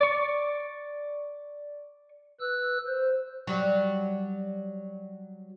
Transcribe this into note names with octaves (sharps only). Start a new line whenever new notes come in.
D5 C#6
B4 E6 F#6
C5
F#3 G3